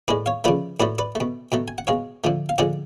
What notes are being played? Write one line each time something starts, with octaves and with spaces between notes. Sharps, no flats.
A2 G#3 B4 D5
C#5 F5
C#3 F3 A3 B4 D5
A2 F#3 A3 B4 D5
B4 D5
A3
B2
B2 F#3 A3
G#5
F#5
B2 G#3 C#5 F5
D3 F3 A3
F5
D3 F3 G#3 D5 F#5